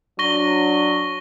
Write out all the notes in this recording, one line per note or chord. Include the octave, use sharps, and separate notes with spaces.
F#3 D4 C#6 A#6 G7